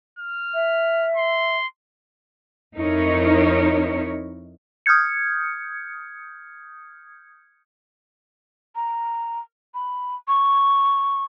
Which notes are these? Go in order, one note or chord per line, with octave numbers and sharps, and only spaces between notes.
F6
E5
C6
F2 C4 D#4 E4 A#4 C#5
D#6 F6 G6 G#6 C#7
A#5
B5
C#6